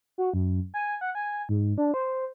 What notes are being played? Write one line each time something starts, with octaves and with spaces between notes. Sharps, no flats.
F#4
F#2
G#5
F#5
G#5
G#2
D4
C5